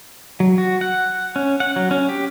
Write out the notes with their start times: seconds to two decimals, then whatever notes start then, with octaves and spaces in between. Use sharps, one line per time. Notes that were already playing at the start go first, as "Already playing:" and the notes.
0.40 F#3
0.58 F#4
0.81 F#5
1.36 C#4
1.60 F#5
1.76 F#3
1.91 C#4
2.09 G4